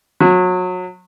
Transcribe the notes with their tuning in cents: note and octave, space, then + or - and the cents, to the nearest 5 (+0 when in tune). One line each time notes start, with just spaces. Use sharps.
F#3 -25